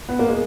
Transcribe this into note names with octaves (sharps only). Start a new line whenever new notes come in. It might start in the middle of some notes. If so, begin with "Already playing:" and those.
B3
A#3
G#3